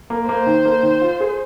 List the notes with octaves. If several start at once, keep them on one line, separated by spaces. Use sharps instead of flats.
A#3
A#3 C5
D#3
A#3
D#3
F4
G#4